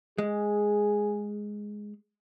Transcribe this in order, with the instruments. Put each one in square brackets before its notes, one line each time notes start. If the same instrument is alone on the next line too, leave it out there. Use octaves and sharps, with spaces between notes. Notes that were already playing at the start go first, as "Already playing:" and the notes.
[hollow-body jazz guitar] G#3 [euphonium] G#4